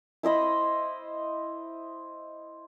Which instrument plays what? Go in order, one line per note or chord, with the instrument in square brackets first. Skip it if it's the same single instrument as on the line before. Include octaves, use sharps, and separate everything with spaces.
[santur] E4 C5 D#5 B5